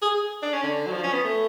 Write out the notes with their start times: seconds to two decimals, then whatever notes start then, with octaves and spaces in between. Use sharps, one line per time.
0.02 G#4
0.43 D4
0.53 C#4
0.63 D3
0.86 F#3
0.93 F3
1.04 C#4
1.13 B3
1.24 A3